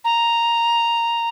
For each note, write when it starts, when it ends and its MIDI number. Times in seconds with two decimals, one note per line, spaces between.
0.04 1.29 82